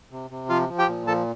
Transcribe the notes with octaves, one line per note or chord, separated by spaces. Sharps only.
C3
C3
F3 F4 F5
F3
G4 G5
A#2
F3 A4 A5